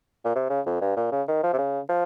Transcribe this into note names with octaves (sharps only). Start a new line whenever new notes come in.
A#2
C3
C#3
F2
G2
A#2
C#3
D#3
F3
C3
C#3
F3